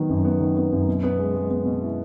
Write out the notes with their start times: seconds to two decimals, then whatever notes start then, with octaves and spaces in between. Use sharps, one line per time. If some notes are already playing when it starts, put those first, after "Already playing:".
Already playing: D#3 F#3 B3
0.10 F#2
0.25 B3
0.41 D#3
0.57 B3
0.72 F#2
0.88 B2
1.03 B3
1.18 G#3
1.35 G#3
1.50 B3
1.65 B2
1.82 E4